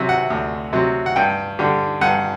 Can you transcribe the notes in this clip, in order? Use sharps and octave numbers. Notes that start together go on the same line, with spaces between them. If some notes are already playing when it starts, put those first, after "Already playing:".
Already playing: C3 F#3 E5
F#5
D2
C3 F#3
F#5
G2 G5
D3 G3
G2 F#5